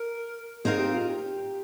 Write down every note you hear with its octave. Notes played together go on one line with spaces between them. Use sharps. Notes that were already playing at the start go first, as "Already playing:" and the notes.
Already playing: A#4
C4 D#4 G#4 A#4 F5
G4
F4
G4